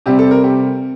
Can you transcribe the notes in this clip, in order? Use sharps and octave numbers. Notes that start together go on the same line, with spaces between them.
C3 G3 C4 G4
A4
A#4
G4